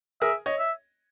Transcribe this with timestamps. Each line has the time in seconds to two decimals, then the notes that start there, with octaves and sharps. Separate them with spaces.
0.21 G#4 A#4 E5
0.46 C#5 D#5
0.59 E5